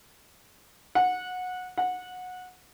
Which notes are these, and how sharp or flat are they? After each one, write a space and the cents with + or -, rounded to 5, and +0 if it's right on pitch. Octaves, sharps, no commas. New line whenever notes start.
F#5 -20
F#5 -20